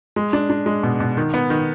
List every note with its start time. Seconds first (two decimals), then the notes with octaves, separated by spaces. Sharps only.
0.16 G#3
0.33 D4
0.50 D4
0.66 G#3
0.83 B2
1.00 B2
1.17 D#3
1.34 B3
1.50 D#3